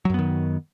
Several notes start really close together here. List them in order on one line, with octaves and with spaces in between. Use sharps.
F#3 F#2 B3 D#3